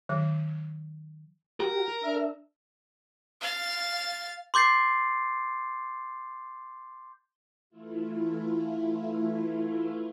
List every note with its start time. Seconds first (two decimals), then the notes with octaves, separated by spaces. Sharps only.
0.09 D#3 F#3
1.60 F#4 G4 A#4
2.03 D4 E5
3.41 F5 A6
4.54 C6 D6 G6 A6 C7
7.70 E3 A3 E4 F4